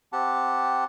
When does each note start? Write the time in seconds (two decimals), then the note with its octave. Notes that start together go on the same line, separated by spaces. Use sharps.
0.13 C4 G4 F#5 A5